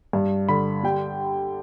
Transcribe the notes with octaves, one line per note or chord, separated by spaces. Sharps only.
G2
D3 B5
G3 G5